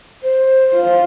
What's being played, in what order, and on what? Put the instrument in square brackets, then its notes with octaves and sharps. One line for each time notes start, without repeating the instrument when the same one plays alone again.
[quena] C5
[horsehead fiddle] F4